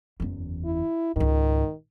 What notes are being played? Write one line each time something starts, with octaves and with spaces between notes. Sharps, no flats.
F#1 E2
E4
C#2 G#2 D#3